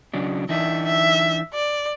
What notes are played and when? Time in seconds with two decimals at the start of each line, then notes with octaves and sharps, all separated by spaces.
0.14 C#3 F#3 D4
0.49 E3 D4 D#4 E5
0.85 E5
1.54 D5